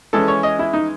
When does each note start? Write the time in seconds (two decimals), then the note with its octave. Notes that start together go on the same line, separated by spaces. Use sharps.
0.13 E3 G#3 C#4 A4
0.28 C#5
0.43 D#5
0.59 E4
0.73 D#4